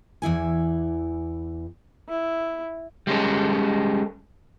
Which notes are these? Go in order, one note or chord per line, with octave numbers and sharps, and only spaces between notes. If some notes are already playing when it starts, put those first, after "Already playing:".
E2 E3 E4 G#5
E4
G3 G#3 C#4 A4